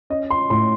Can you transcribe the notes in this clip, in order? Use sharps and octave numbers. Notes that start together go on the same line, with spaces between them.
C#4 D#5
C6
A2 C6